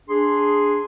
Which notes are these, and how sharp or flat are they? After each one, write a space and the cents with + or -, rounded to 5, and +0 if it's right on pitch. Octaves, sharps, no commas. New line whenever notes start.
D4 +0 G#4 -5 C6 +0